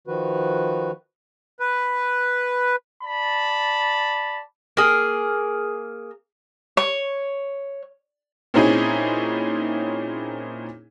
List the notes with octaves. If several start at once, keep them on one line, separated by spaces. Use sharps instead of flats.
D#3 F3 F#4 B4
B4
D5 A5 B5
A#3 G#4
C#5
A#2 C4 C#4 D#4 E4 G#4